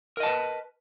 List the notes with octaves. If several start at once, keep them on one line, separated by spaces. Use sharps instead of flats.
A#4 B4 D#5 A5